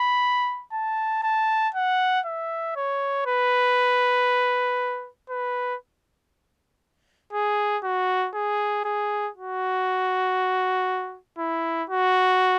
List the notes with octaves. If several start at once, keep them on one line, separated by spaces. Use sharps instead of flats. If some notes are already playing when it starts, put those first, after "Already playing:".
Already playing: B5
A5
A5
F#5
E5
C#5
B4
B4
G#4
F#4
G#4
G#4
F#4
E4
F#4